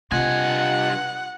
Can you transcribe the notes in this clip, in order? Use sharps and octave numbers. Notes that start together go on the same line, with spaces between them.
G2 C3 F4 D#5 F#5 G#5